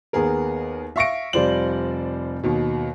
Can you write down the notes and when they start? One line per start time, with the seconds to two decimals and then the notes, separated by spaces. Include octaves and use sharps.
0.13 D#2 B3 G#4 A#4
0.96 E5 F5 C#6 A#6 C#7 D7
1.33 F1 G3 F4 C5 D5 F#7
2.44 D#2 B2